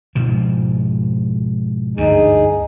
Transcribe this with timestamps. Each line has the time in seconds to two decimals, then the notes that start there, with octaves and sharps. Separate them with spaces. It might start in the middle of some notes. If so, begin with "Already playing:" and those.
0.15 G#2 B2 F3
1.97 D2 G2 D#4 G#4